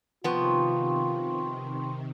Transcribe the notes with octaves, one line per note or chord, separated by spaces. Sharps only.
C3 D#3 F3 B3 F4 G5 C6 C#6